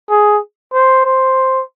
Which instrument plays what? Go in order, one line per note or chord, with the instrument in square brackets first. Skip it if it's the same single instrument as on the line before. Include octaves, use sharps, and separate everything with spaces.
[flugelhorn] G#4
C5
C5